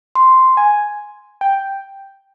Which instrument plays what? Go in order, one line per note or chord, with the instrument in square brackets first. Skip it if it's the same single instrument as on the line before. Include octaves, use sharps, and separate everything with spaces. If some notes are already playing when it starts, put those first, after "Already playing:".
[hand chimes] C6
[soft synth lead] G#5
G5